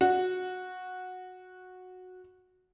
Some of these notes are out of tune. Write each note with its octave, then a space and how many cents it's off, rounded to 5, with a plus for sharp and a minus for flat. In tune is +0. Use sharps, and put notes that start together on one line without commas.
F#4 -10